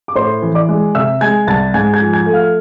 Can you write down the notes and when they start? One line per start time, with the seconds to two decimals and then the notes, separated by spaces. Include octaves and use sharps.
0.08 D6
0.16 A2 C5 C6
0.42 E3
0.55 D5 D6
0.69 G#3
0.95 C3 E5 E6
1.21 G#3 G#5 G#6
1.47 C2 A5 A6
1.74 G#2 G#5 G#6
1.94 G#5 G#6
2.01 F3
2.13 G#5 G#6
2.26 A3
2.33 F5 F6